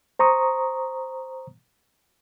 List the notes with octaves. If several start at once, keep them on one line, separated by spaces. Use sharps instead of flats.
C5 A#5 C#6 D#6